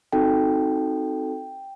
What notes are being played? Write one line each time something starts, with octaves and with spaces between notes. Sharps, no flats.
C4 D#4 F#4 A4 G5